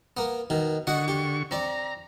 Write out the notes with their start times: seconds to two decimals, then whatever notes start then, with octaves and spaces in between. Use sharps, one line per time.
0.17 A#3 B3
0.50 B2 D#3
0.87 D3 F#4 D#5 F#5 C#6
1.08 G4
1.51 C4 D5 A#5